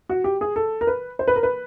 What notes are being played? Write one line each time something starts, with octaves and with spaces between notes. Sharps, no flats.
F#4
G4
G#4
A4
A#4
B4
C5
B4
A#4
B4